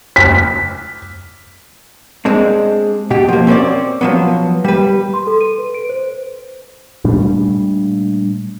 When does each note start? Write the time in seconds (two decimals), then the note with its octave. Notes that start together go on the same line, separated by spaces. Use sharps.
0.16 B6
2.25 G#3 C4 D4
3.10 B2 G4
3.28 F3 A#3
3.47 C4 C#4 F4 C5 D5
4.01 F3 F#3 B3
4.65 G3 B4
5.14 C6
5.27 A4
5.41 D#7
5.58 B4
5.74 D7
5.89 C5
7.04 A#2 G3 A3 D4